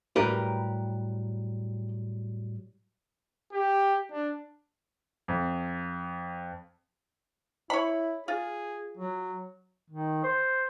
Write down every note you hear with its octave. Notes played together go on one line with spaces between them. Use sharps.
A2 F#3 G3 G4 A#4 B4
G4
D4
F2
E4 C#5 B5
F4 G#4
F#3
D#3
C5